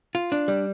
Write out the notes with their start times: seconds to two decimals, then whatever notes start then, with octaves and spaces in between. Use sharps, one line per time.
0.15 F4
0.32 D4
0.48 G3